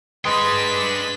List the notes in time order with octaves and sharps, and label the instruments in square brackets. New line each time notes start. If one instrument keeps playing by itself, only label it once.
[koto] G#3 [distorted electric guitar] D4 G5 [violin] B4 B6